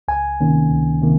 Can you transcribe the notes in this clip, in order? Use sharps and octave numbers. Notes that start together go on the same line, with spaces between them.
C#2 G#5
C3 D#3 A#3 C#4
C#2
C3 D#3 A#3